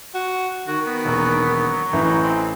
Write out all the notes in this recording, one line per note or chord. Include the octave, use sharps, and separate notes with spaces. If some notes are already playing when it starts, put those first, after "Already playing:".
F#4
D#3 F#4
B3
E1 F#3 A#3 A#4
A1 E3 A3 D#4 E5
C4